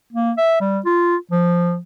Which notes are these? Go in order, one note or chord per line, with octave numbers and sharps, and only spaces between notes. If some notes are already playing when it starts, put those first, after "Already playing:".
A#3
E5
G3
F4
F3